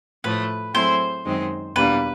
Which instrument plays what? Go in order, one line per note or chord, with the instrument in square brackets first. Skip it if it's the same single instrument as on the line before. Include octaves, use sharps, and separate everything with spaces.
[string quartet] A2 F3 A3 [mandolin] B4
[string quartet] F#3 A3 C4 E4 G#4 [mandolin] C5
[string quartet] F#2 D#3 G#3 C4 D#4
[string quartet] E2 B2 G3 A#3 D4 [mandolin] B4